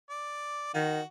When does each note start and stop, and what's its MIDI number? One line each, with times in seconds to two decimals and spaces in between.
0.10 0.73 74
0.74 1.00 51
0.74 1.03 66